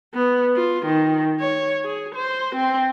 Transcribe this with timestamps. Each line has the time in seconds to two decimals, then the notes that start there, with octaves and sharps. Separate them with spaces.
0.14 B3
0.56 F4
0.85 D#3
1.40 C#5
1.84 G#4
2.15 C5
2.55 C4